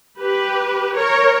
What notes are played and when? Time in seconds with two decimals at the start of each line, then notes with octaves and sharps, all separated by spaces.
0.20 G4 B4
0.96 A#4 C#5